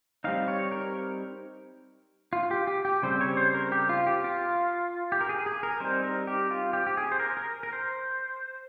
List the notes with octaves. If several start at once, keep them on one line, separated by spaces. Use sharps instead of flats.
G3 C4 D#4 F5
C#5
A#4
F4
G4
G4
G4
C#3 G3 C4 C5
C#5
C5
A#4
G4
F4
G4
F4
G4
A#4
G#4
G#4
A#4
G3 C4 D#4 C5
A#4
G4
F4
G4
G4
G#4
C5
A#4
A#4
A#4
C5